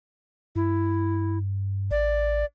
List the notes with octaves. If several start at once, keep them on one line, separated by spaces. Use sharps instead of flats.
G2 E4
A1 D5